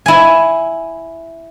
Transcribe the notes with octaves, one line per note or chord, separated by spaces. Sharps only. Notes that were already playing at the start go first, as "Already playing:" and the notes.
E4 G#5